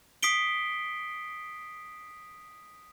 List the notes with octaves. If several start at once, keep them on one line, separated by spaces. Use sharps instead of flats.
D#6 B6 C7 D7 G7